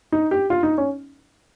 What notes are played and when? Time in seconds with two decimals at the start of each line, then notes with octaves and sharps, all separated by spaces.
0.12 D#4
0.31 G4
0.50 F4
0.63 D#4
0.78 C#4